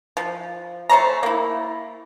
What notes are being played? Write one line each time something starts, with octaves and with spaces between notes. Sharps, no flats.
F3
A3 C5 C#5 A#5
A#3 E4